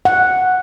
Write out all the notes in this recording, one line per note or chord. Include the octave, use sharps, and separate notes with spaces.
F#5